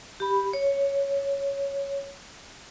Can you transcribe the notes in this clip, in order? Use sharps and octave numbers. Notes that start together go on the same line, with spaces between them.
G4 B5
C#5